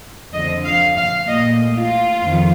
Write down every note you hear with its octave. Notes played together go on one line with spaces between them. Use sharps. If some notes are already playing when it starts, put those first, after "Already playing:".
F2 D3 F3 D#5
F5
F5
A#2 A3 D#5
F4
F2 D#3